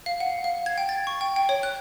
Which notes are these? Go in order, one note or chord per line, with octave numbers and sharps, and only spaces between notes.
F5
F#5
F5
G#6
G5
A6
C#6
G5
G5
C#5
F#6